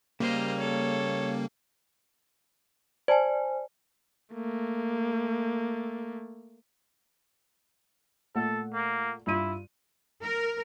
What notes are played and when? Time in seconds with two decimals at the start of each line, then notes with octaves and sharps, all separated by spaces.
0.20 C#3 G3 A#3 A#4 C5 D#5
0.59 A4 C#5
3.08 C5 D5 G#5 A5
4.34 A3 A#3
8.35 A#2 A3 A4 F#5
8.74 A#3
9.27 G2 E4 F4 D#7
10.24 A#4